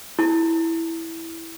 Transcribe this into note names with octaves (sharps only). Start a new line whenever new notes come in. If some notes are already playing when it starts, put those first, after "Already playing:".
E4